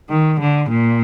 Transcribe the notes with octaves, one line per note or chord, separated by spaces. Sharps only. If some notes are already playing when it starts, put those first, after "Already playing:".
D#3
D3
A#2